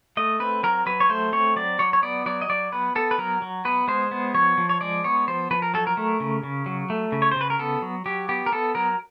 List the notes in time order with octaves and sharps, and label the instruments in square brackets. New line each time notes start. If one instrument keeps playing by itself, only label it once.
[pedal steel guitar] A3 D#5
C4 B4
F#3 A#4
F#3 B4
C#5
A3 C5
C4 C#5
F#3 D5
F#3 C#5
C#5
B3 D5
F#3 D5
D#5
F#3 D5
B3 B4
B3 A4
B4
F#3 A#4
F#3
B3 B4
G#3 C5
B3
F3 C#5
F3
C#5
G#3 D5
B3 C#5
F3 C5
F3 B4
A#4
F#3 A4
A#4
A3
C#3
C#3
F#3
A3
C#3
C#5
C5
C#3 B4
A#4
B3 A4
F#3
F#3 G4
B3 G4
A#4
B3 A4
F#3 A#4